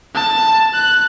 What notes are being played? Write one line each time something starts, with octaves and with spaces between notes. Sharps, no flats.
A5
F#6